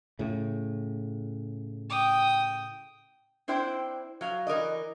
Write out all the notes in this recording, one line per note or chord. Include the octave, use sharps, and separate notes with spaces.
A2 C#3
G5 D#6
C4 D4 E4 C5 G5
F#3 F5
E3 A#4 D5 D#5